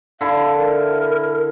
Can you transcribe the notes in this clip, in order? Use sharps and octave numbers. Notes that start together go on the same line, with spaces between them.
D3 E4 F5
A#4